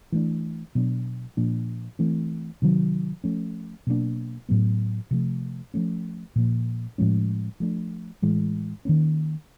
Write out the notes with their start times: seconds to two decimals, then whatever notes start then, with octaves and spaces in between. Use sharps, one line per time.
0.12 E3 A3 D4
0.75 B2 F#3 B3 D4
1.37 A#2 F3 A#3 D4
1.99 E3 A3 C4
2.62 C3 D#3 F#3
3.24 F3 A3 C#4
3.87 B2 F#3 A#3 D4
4.49 A2 F#3 B3
5.11 C3 F3 A3
5.74 F3 A3 C#4
6.36 A#2 F3 A#3
6.98 A2 F3 G#3 C#4
7.60 F3 A3 D4
8.22 A2 E3 G#3
8.85 D#3 F#3 A#3 C#4